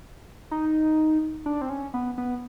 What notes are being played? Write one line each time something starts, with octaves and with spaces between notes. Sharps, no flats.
D#4
D4
C4
C#4
B3
B3